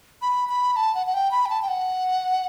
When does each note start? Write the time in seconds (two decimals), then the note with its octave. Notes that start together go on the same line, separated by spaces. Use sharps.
0.22 B5
0.49 B5
0.76 A5
0.95 F#5
1.07 F#5
1.14 G5
1.31 B5
1.46 G5
1.50 A5
1.62 G5
1.68 F#5